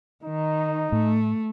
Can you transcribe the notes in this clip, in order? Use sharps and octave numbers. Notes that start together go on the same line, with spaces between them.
D#3 D#4
A2 A3